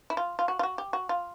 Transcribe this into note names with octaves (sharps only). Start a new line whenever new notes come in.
E4
F4
F4
F#4
F4
F#4
G4
F#4
F4